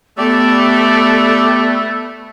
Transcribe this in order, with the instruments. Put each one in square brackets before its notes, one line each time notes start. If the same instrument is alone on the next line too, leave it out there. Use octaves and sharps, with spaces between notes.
[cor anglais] A3 [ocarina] B3 [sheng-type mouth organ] G4 D5 [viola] A4 B4